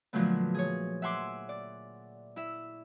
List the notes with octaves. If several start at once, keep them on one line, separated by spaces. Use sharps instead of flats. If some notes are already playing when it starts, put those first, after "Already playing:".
A#2 D3 F3 F#3 A3 B3
G#4 C#5
E5 F#5 G#5 C6 D6
D5
E4 E5